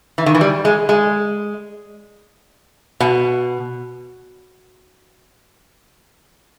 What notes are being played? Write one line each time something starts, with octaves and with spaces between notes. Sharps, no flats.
E3
D#3
E3
G3
G#3
G#3
B2